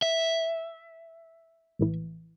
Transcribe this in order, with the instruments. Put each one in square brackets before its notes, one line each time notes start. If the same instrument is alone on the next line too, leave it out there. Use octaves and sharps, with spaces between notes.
[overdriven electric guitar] E5
[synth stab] A#1 A2 E3